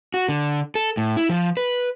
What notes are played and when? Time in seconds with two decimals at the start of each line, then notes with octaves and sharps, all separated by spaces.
0.14 F#4
0.29 D3
0.75 A4
0.97 A2
1.17 E4
1.29 F3
1.57 B4